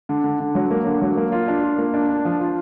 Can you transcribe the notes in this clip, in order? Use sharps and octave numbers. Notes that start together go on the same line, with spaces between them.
D3
D3
D3
F#3
A#3
D3
F#3
A#3
F4
D4
F4
A#3
D4
D4
F3
F4